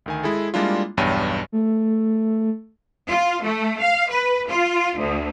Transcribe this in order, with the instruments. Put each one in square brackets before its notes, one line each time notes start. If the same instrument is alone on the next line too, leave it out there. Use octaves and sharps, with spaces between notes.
[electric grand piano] D2 D#3 G#5
G#3 E4 G#4 A4
G3 G#3 A#3 D4 E4 F4
B1 E2 G2 C#5 G5 D#7
[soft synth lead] A3
[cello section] F4
A3
F5
B4
F4
D2